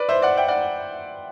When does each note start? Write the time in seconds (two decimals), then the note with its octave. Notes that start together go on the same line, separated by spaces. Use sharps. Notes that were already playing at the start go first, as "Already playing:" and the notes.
Already playing: B4 D5
0.09 C5 E5
0.22 D5 F#5
0.37 E5 G5
0.48 D5 F#5